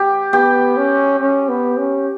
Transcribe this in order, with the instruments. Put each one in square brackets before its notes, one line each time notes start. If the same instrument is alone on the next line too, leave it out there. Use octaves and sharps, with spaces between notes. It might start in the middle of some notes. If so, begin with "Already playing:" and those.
Already playing: [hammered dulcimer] G4
[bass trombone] B3 [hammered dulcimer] G4
[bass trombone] C#4
C#4
B3
C#4